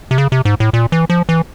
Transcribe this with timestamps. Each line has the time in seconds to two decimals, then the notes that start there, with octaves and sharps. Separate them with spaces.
0.11 C3
0.18 C#3
0.32 C3
0.45 G#2
0.60 A2
0.73 A#2
0.92 E3
1.10 F3
1.29 E3